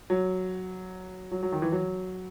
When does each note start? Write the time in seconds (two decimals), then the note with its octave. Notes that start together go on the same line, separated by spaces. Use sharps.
0.10 F#3
1.31 F#3
1.43 F#3
1.52 D#3
1.62 E3
1.72 F#3